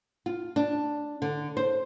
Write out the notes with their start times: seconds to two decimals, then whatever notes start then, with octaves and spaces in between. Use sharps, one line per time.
0.26 F4
0.56 D4
1.22 D3
1.57 C5